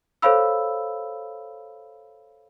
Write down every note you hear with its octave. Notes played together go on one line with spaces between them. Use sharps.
A4 C5 C#5 F5 B5 E6